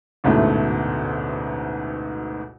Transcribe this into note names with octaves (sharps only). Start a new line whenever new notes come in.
A1 D2 G#2 B2 A3